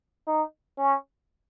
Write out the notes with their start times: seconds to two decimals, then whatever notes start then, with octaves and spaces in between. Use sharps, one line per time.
0.27 D#4
0.78 C#4